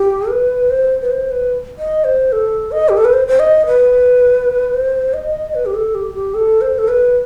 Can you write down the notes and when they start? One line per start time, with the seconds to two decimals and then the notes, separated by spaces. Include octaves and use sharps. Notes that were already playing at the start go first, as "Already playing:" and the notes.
Already playing: G4
0.30 B4
0.71 C5
1.02 B4
1.11 C5
1.31 B4
1.78 D#5
2.04 C5
2.32 A4
2.72 D#5
2.89 G4
2.97 A4
3.05 B4
3.13 C5
3.28 C5
3.39 D#5
3.67 B4
4.74 C5
5.14 D#5
5.55 B4
5.66 G4
5.75 A4
5.95 G4
6.14 G4
6.34 A4
6.61 C5
6.78 A4
6.88 B4